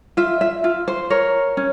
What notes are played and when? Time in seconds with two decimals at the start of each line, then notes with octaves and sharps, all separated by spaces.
0.17 F4 E5
0.41 E5
0.64 F4
0.88 C5
1.10 A#4 C#5
1.57 C#4